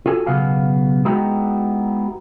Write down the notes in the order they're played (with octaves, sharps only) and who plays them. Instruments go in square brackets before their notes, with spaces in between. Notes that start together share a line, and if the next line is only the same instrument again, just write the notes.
[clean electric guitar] F4 F#4 A4 G#5
B1 C#3 B3 F5 G#5
G#3 B3 D#4 E4 F#4 G4